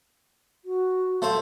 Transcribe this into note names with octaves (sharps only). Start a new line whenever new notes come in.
F#4
A3 C5